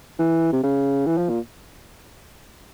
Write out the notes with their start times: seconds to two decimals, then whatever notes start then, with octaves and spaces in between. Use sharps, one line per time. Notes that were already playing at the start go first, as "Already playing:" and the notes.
0.19 E3
0.52 C3
0.63 C#3
1.07 E3
1.18 F3
1.29 A#2